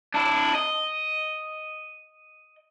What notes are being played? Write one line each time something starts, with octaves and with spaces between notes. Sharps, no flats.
D4 E4
D#5